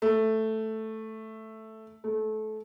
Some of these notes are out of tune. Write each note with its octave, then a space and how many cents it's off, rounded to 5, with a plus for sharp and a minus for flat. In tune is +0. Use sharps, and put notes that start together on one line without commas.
A3 +0
A3 -25